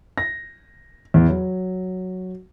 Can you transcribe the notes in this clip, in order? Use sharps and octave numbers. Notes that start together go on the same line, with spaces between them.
A#6
E2
F#3